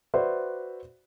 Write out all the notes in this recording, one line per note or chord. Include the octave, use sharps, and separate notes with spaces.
F#4 B4 C5 D5 E5